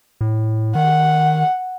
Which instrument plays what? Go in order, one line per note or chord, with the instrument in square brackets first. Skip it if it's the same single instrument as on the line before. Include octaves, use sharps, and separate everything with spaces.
[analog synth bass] A2
[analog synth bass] D#3 [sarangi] F#5